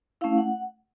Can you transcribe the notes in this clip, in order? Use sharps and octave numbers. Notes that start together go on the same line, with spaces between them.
A3 C#4 E4 F5
F#5